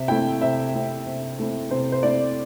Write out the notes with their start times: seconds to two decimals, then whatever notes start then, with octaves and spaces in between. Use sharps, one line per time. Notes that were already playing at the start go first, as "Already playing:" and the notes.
Already playing: C3 E5
0.08 A3 C4 E4 G5
0.41 C3 E5
0.73 A3 C4 E4
1.06 C3
1.38 A3 C4 E4
1.71 C3 C5
1.92 C5
2.03 A3 C4 E4 D5